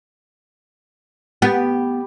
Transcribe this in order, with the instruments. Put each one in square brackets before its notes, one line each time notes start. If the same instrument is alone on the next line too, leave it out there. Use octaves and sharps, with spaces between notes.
[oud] B3 [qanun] G4